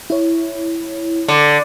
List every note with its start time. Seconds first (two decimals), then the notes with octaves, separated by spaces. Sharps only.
0.10 E4 C#5
1.28 D3